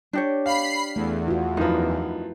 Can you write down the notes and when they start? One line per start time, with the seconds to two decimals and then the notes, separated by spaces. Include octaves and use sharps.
0.13 D4 G4 C#5
0.46 F5 B5 C7
0.96 E2 A3
1.28 F4 F#4
1.57 F#2 F3 D#4 E4 B4